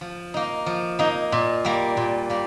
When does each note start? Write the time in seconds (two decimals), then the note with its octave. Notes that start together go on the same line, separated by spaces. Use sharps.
0.01 F3
0.34 A#3 D#4
0.66 F3
0.99 A#3 D#4
1.32 A#2
1.65 G3 A#3
1.97 A#2
2.30 G3 A#3